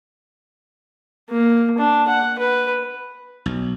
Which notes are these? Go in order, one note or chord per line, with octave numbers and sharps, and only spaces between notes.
A#3
D4
F#5
B4
B1